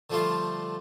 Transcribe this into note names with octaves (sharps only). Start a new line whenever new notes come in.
D3 F3 G3 A3 F4 C6